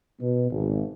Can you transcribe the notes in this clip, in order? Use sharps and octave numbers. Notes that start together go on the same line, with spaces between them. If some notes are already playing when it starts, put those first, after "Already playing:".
B2
G#1